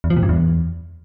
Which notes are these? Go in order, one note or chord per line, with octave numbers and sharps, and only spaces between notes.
E2
F3
A#2
G2
E2